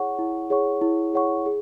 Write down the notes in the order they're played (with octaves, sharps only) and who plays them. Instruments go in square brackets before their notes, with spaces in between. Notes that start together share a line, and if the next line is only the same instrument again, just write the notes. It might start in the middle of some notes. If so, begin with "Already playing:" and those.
Already playing: [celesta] E4 G#4 C#5 F#5 C#6
E4
G#4 C#5 F#5 C#6
E4
G#4 C#5 F#5 C#6
G#4